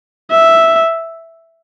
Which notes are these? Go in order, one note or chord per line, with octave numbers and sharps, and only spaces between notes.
E5